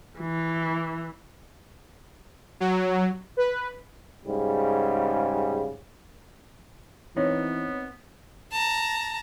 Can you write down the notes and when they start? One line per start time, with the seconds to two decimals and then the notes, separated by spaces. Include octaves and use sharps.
0.20 E3
2.60 F#3
3.37 B4
4.26 G#2 C#3 G3
7.17 E3 B3 C4 D#4 C#5
8.52 A5 A#5